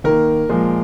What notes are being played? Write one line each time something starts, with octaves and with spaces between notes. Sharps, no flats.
D#3 A#3 A#4
A#2 F3 G#3